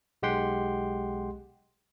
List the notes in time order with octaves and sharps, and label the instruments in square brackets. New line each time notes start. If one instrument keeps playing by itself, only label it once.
[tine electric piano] B1 G#3 G4 F#5 G5 C6